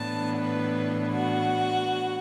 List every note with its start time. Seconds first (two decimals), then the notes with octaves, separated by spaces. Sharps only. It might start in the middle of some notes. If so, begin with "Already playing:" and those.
Already playing: A2 E3 B3 D4 A5
0.38 B4
1.12 F#4